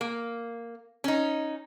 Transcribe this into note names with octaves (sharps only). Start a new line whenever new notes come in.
A#3
C#4 D#4